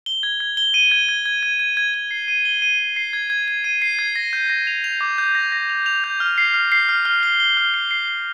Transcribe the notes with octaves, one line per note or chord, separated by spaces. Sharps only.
G7
G#6
G#6
G7
D#7
G#6
G#6
G#6
G#6
G#6
G#6
G#6
C7
D#7
G7
D#7
D#7
C7
G#6
G#6
G#6
D#7
C7
G#6
A#6
G6
A#6
F7
F7
D6
G6
A#6
A#6
F7
F7
G6
F6
C7
F6
C7
F6
F6
G7
G7
F6
C7
C7
C7